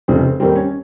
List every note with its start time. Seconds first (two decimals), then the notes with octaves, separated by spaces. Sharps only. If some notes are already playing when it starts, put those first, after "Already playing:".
0.08 F1 F2 C#3 C4
0.40 D#2 D#3 G3 C4
0.55 C#4